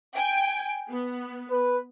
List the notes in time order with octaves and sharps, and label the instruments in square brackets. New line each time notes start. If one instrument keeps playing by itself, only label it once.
[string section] G5 G#5
B3
[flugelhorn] B4